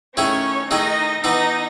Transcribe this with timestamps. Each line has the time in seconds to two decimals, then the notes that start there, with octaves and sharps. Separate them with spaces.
0.17 D#3 A3 C#4 E4 G#4 C#5
0.70 D#3 A3 D#4 E4 G#4 D#5
1.24 E3 B3 D#4 E4 D#5